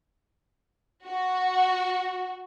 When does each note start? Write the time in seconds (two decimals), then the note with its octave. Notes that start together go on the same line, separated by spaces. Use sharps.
1.07 F#4